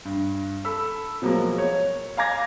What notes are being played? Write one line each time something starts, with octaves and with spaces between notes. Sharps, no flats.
G2
A4 B5 E6
B2 F3 F#3 G#3 A#3
C#5
F5 G#5 A#5 D6 G#6 A#6